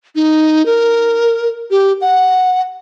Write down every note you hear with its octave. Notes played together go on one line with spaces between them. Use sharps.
D#4
A#4
G4
F#5